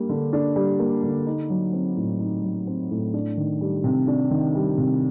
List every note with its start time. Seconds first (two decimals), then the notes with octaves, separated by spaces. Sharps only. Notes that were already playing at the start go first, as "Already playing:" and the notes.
Already playing: G3 A#3 D4
0.09 D3
0.33 D4
0.56 G3
0.79 A#3
1.03 D3
1.26 D#4
1.50 F#3
1.73 C4
1.97 A2
2.20 D#4
2.43 F#3
2.67 C4
2.90 A2
3.14 D4
3.37 D#3
3.61 G3
3.84 C3
4.08 D4
4.31 D#3
4.55 G3
4.78 C3